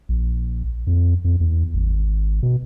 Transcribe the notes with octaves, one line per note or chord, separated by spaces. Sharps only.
A#1
F2
F2
E2
G#1
B2